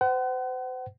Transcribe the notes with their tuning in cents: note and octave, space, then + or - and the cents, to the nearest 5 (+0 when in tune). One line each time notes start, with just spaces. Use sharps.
C5 -35 F#5 +35